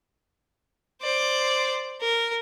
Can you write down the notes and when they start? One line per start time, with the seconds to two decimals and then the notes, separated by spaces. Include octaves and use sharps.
1.01 C5 D5
2.01 A#4